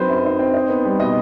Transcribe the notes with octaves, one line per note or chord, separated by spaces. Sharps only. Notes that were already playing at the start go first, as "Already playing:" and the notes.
Already playing: F#3 C4 D#4 B4 C5
F#2
D#4
C4
D#4
B3
G3
B2 D#5